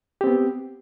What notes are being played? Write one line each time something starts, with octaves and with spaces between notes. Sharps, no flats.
B3 C4 G4